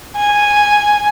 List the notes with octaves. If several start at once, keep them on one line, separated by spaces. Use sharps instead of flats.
G#5